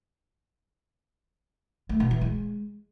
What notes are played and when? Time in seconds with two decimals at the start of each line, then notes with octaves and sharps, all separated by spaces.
1.89 A3
2.00 B2
2.11 E3
2.21 G#3